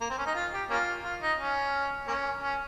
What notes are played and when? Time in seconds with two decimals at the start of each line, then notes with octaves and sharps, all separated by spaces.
0.01 A#3
0.10 C4
0.18 C#4
0.26 D#4
0.35 F4
0.53 G4
0.70 A#3 C#4 F4
1.04 F4
1.21 D#4
1.39 C#4
2.07 A#3 C#4
2.43 C#4